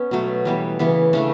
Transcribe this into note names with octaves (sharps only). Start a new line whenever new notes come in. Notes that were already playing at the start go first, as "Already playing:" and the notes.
Already playing: B3 C#4
B2 F#3 A3
E3 G3 B3
C#3 E3 B3
C#3 E3 A3 D4